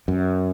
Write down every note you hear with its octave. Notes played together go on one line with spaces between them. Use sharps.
F#2